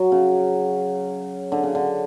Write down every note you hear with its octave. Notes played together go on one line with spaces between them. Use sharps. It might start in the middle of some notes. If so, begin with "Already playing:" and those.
Already playing: F#3
C#3
D3
C#3
D3